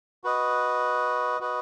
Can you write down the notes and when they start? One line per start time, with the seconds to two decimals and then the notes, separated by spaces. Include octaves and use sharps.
0.24 F#4 B4 D#5
1.40 F#4 B4 D#5